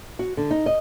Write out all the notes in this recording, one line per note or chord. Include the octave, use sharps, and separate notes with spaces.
F#4
D3
D#4
D#5